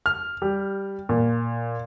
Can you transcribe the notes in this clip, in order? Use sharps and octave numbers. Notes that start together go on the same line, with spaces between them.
F6
G3
A#2